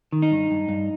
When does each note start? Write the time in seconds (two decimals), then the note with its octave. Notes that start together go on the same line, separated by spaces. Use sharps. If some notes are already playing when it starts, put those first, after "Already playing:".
0.13 D#3
0.22 D#4
0.31 G2
0.51 G2
0.69 G2